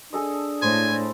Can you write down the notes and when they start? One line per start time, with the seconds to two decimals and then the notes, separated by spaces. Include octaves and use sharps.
0.13 D4 G#4 A4 D#5
0.62 A2 C5 G#5